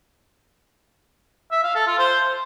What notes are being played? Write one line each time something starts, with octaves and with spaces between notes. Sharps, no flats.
E5
F5
A4
F4
C5